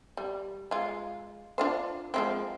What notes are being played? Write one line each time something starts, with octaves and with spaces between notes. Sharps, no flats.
G3
G#3 F4
D4 F4 C5
F3 G#3 C4